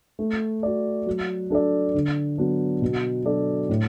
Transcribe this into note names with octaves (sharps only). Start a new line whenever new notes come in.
A3
F#4 D5
F#3
D4 A4 D5
D3
F#3 B3 D4
B2
F#3 D4 A4 D5
A2